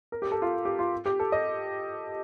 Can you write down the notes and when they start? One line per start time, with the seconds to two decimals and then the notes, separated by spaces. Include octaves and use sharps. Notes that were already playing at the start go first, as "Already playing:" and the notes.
0.12 A#4
0.22 G4
0.32 A4
0.42 F4
0.65 G4
0.79 F4
1.06 G4
1.20 A4
1.32 D#5